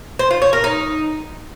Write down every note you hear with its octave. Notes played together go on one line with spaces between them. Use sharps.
C5
F4
C#5
A#4
D#4